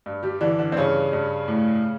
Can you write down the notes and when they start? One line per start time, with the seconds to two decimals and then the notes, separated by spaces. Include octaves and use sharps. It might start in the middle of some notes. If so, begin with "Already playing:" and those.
0.06 G2
0.23 G3 G4
0.41 D3 E3 D4
0.59 D3 D4
0.72 C4
0.76 G2 C#3 C#4
1.13 G2
1.48 A2